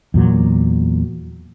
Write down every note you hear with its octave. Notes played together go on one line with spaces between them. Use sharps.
E2 A#2 F#3